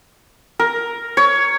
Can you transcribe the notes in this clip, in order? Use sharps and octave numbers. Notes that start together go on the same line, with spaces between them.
A#4
C#5